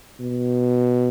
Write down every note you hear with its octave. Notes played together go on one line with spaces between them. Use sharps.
B2